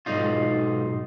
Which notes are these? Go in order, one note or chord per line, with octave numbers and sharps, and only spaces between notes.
B1 G#2 D#4 F4